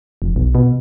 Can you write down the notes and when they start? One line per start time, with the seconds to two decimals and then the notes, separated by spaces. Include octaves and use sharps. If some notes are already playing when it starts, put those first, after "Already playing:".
0.22 F1
0.36 B1
0.55 B2